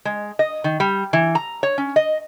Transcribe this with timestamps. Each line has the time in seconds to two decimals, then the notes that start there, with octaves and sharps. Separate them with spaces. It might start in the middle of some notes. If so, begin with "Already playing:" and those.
0.05 G#3
0.39 D#5
0.64 D#3
0.80 G3
1.13 E3
1.35 A#5
1.63 C#5
1.78 C#4
1.96 D#5